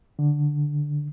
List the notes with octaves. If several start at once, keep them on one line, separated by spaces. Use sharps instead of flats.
D3